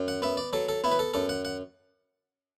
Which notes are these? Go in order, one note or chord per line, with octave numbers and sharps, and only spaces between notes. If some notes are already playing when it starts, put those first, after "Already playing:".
Already playing: F#2
F#5
B3 E5
D5
F#3 A4
A4
B3 E4
B4
A4
F#2 A4
F#5
F#5